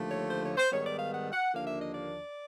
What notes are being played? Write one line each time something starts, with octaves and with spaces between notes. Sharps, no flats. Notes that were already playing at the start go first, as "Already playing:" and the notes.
Already playing: D#2 D3 F3 A3
C#5
C5
C#5
C5
G#2 D#3 G3 B3 C#5
D5
F5
F#5
F#5
D#2 D3 F3 A#3 D4 F5
E5
D#5
D5